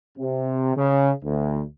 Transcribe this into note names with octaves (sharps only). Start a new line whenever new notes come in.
C3
C#3
D2